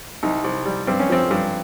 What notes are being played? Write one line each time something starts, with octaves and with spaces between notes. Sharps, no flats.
C2 D#4
C2
G3
G2 C4
C#4
F3 C4
G2